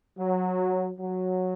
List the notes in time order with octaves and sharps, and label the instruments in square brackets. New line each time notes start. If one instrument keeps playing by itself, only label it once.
[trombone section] F#3
F#3